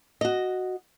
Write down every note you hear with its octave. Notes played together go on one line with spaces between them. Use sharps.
F#4 D#5